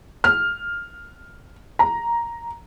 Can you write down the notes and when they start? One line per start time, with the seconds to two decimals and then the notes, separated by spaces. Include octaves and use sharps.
0.24 F6
1.79 A#5